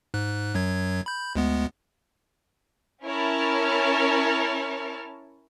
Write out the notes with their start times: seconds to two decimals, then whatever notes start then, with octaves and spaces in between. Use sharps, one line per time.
0.14 G#2 F#6
0.55 F#2 F#3 G#6
1.06 B5 G6
1.35 D2 G#3 B3
3.05 C#4 E4 A#4 C#5 A5 F6